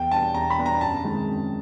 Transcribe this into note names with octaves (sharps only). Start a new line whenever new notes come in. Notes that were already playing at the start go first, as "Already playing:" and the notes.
Already playing: E2 G5
B2 G3 B3 D4 A5
E2 A#5
B5
B2 G3 B3 D4
A#5
F#2 A5
D#3 G#3 C4
F#2